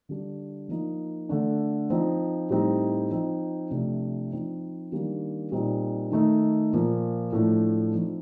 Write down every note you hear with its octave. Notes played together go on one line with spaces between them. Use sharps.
D3 G3 D4
F3 A#3 D#4
D3 A3 D4
F3 C4 D#4
A2 G3 C4 D#4
F3 C4 D#4
C3 F3 A3 D4
F3 C4 D#4
D#3 G3 A#3 D4
A#2 G3 C4 D#4
D#3 A3 D#4
A#2 F3 A#3
A2 F3 A3 D4
F3 C4 D#4